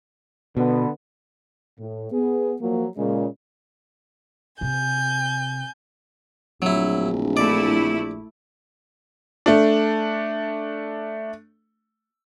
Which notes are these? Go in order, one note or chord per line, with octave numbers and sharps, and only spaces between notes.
B2 D3 B3
A2
B3 G#4
F3 F#3 A#3
A#2 C#3 G#3
C3 G#5 G6
D1 A#1 F#3 E4
A3 E4 D5
A3 D4